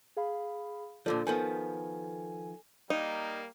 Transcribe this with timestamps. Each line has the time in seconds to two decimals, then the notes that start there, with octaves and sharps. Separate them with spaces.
0.17 G#4 F5 B5
1.06 A#2 D3 F3 F4 A4 D5
1.27 D#3 F3 B3 A4 G#5
2.90 G3 A#3 D#4